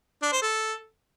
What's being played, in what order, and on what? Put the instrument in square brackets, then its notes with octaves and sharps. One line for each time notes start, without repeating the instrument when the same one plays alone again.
[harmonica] D4
C5
A4